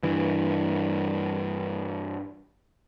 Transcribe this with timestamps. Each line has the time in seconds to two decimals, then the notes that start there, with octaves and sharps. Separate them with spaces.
0.03 G2 E3